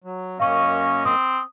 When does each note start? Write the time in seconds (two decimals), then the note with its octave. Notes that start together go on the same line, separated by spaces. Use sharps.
0.04 F#3
0.40 F#2 A#3 C#4 D#5 F5 C#6
1.05 C4 D#6